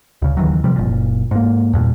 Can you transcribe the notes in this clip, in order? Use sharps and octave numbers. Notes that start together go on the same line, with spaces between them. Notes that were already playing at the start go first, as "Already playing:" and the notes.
D2 C#3
D#2 D#3 E3 F#3
C3 F3 G3
F#1 A#2
G#2 A#3
E2 G2 A#2